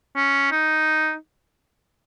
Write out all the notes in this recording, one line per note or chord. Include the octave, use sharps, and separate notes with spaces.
C#4
D#4